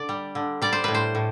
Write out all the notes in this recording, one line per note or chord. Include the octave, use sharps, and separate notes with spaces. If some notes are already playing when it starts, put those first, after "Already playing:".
Already playing: D3 D5
G3
D3
G3 D5
C5
A2 B4
C5
A2